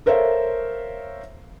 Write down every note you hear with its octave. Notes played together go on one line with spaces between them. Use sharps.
A4 A#4 C5 C#5 E5 F5